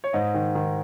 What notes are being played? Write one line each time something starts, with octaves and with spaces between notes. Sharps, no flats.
C#5
G#2 D#5
D#3
D#3